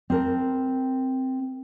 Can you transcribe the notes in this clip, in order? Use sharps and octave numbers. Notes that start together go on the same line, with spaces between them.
C4 A#4 A5